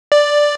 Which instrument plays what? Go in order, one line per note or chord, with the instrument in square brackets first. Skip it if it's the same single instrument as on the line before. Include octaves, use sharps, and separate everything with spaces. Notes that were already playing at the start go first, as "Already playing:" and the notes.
[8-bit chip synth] D5